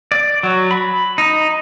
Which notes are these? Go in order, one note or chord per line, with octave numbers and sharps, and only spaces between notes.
D5
F#3
B5
D#4